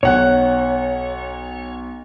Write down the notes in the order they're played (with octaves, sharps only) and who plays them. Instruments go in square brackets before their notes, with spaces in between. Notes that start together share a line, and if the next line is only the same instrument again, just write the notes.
[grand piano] B1 F#5 F#6 [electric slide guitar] C#5